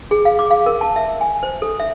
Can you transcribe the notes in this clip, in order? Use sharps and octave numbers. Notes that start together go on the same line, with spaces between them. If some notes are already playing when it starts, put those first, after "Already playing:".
G#4
F5
D6
F5
A#4
A5
E5
G#5
C5
A4
E5